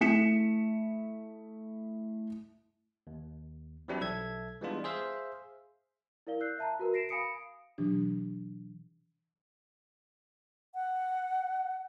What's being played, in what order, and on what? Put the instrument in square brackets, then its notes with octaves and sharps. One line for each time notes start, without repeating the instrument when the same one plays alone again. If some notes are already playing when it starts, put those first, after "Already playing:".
[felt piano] A3 E4 B6 C#7 E7
[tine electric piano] D#2
E3 F#3 G3 C4 D4 E4
B1 A4 E5 G#6
E3 G3 G#3 B3 D4 F4
G#4 C5 E5 F5
[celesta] E4 A#4 D5 F5 G7
E6 F#6 G6 C7
E5 A5 A#5
F#4 A#4 B4
A#6 C7 D7 E7
F5 G#5 B5 D#6 C#7 D7
[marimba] B2 E3 F#3 D4 G4
[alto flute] F#5